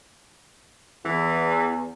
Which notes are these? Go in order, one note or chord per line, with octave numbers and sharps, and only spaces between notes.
E2 E3